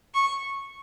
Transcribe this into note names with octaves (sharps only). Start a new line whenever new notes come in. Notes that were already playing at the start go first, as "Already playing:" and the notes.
C#6